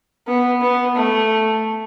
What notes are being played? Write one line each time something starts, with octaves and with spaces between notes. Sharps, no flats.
B3
B3
A3